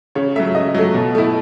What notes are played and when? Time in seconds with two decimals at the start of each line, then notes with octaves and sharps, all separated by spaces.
0.15 C#3 C#5
0.35 F#3 A3 E5
0.55 C#3 D#5
0.74 F#3 A3
0.95 B2
1.15 A3 E4